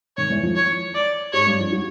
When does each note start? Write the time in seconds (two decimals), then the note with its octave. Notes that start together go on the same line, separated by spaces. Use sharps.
0.17 D#3 C#5
0.30 E2 E3
0.43 F2 F3
0.56 C#5
0.94 D5
1.33 G#2 G#3 C#5
1.46 G2 G3
1.59 F2 F3
1.72 F#3